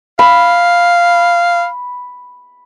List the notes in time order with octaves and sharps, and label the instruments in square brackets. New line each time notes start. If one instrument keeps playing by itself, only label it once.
[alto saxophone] F5 [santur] B5